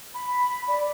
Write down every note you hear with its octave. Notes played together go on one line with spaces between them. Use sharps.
B5
D5